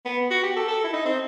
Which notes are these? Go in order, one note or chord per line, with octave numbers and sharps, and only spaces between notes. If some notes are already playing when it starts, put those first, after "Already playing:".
B3
F#4
G4
A4
A4
E4
D#4
C4